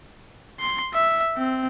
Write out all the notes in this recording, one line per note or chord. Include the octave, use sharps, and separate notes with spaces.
C6
E5
C4